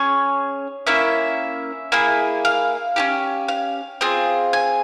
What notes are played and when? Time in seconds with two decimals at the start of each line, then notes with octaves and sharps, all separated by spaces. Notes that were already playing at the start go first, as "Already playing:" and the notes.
Already playing: C#4 G#4 C#5
0.87 A#3 C#4 E4 E5
1.92 A#3 E4 G#4
2.45 F5
2.96 C#4 E4 G4
3.48 F5
4.01 C4 F4 G#4
4.53 G#5